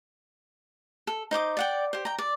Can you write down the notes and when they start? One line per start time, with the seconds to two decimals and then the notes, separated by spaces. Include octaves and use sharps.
1.07 A4
1.31 D#4 C5 D6 D#6
1.57 D5 F#5 G5
1.93 G4 C5
2.05 G5 A#5
2.19 D5